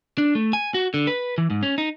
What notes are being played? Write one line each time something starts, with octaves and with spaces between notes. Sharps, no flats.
D4
A3
G#5
F#4
D3
B4
E3
G#2
C#4
D#4